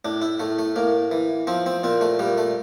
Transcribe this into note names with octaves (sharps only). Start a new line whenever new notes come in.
A2 D4
E4
A2 A3
A3
A2 A#3
E3
F3 C4
C4
A#2 C4
A3
A#2 G3
A3